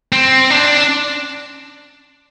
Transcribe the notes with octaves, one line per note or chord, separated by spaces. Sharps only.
C4
D4